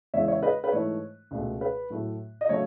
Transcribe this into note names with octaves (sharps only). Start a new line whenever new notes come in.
E2 C#3 G#3 C#5 E5
C#5 E5
B4 D#5
B4
G#2 E3 A3 C#5
C#2 B2 A3
B4
A2 F#3 A3
D#5
C#3 F#3 A3 C#5